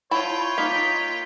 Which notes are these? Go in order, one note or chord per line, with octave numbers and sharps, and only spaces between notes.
E4 F4 C#5 G5 A5 B5
A#3 D#4 B6